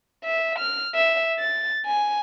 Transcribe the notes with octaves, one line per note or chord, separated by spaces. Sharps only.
E5
F6
E5
A6
G#5